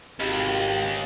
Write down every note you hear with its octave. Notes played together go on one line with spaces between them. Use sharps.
G#1 C#2 G4